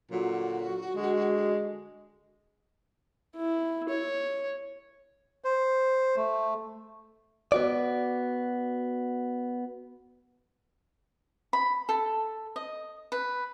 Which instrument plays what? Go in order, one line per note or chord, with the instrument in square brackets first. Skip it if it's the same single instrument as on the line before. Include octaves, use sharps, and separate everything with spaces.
[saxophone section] A#2 D3 F#3 [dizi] F#4
[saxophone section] D3 G#3
[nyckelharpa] E4
C#5
[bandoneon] C5
A3
[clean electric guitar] B3 F#4 D5
[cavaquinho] B5
A4
D#5
B4